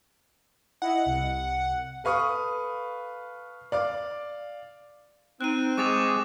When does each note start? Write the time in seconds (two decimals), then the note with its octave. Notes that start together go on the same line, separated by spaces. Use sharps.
0.82 E4 D#5 F#5
1.05 C2
2.04 A4 B4 F5 C#6 D#6
3.72 D5 F5 D6
5.41 C4 D#4 F#6 D#7
5.78 G#3 C#6 D6 A6 F7